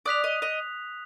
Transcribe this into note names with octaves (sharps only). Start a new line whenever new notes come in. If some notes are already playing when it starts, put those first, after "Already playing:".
D5 D#6 F#6 B6 F7
D#5
D#5